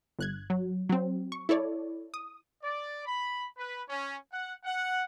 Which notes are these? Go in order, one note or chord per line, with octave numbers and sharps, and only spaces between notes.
G1 F#6 G#6
F#3
F#3 C4
C#6
E4 A4 C#5 D5
D#6
D5
B5
B4
C#4
F#5
F#5